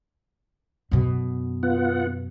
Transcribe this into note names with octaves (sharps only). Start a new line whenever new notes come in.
F#2 B2
B3 F4 F#5